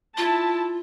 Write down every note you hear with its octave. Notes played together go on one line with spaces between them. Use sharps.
E4 F4 A5